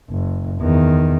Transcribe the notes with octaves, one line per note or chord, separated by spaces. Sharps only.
F#1
E2 D#3